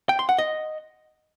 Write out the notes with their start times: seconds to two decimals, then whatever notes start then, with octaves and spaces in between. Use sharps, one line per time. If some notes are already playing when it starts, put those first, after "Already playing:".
0.09 G5
0.19 C6
0.29 F#5
0.39 D#5